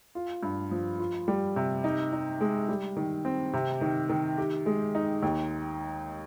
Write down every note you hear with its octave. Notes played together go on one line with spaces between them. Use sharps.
F4
G2
F3
F4
G3
C3
D#4
D#4
G#3
G3
D#3
C4
C3
D#3
D#3
G4
G#3
D#4
D#2